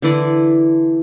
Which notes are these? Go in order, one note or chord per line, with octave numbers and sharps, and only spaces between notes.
D3 E3 E4 D5